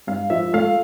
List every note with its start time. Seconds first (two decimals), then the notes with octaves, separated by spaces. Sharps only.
0.07 G2 F5
0.30 F3 E5
0.53 A3 F5